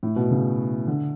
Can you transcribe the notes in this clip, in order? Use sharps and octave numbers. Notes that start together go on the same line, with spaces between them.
A2
B2
C#3
D3